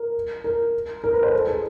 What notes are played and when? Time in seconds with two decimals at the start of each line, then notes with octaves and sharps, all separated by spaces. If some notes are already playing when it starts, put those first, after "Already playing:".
Already playing: A#4
0.44 A#4
1.04 A#4
1.13 B4
1.23 C5
1.33 A4
1.47 G#4